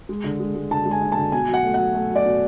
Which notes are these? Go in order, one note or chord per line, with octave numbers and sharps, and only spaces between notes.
G#3
D3
G#3
G#3
D3 A5
G#3
G#5
D3
D3 A5
B2 G#5
F#3
F#5
A3
F#3 F#5
A3
F#3
D5
B2